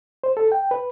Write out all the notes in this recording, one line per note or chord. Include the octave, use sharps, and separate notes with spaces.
C5
A4
G5
B4